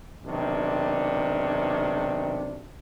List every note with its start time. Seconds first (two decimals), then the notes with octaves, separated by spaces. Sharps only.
0.24 B1 C3 D#3 D4